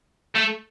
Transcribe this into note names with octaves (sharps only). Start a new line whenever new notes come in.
A3